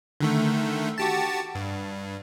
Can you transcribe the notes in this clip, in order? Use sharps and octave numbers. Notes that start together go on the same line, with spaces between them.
D3 D#3 A3
F#4 G4 A5
G2